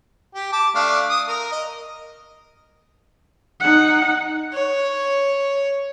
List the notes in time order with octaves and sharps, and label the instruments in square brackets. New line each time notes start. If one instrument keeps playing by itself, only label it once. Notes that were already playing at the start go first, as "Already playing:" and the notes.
[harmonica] G4
A5 D6
A3 D4 F5
D#6
A#4
D#5
[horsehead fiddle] D#4 F#5
[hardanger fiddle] C#5